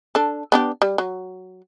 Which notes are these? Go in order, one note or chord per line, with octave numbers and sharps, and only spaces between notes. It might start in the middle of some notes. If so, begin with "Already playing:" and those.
D4 A4
B3 D4 G4
G3
F#3